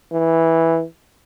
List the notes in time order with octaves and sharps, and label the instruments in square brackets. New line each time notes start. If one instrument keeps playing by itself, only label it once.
[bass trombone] E3